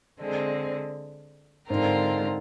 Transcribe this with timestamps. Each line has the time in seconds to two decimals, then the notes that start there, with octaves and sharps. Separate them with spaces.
0.19 D3 G#3 C4
1.69 G#2 D3 G#3 C4 F4 A#4